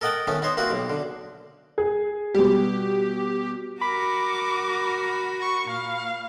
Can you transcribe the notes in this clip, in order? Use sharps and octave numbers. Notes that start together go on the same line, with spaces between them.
A4 A#4 D#5 F#5 G5 A5
D#3 A3 B3 C#4
B3 D#4 C5 C#5
A#3 C4 E4 F#4 B4
B1 B2
D3
G#4
B2 G3 G4
F#4 A#4 B5 D6
C#6
A#2 F5